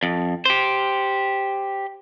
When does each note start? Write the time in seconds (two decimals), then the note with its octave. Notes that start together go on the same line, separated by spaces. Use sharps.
0.03 F2
0.46 G4 C5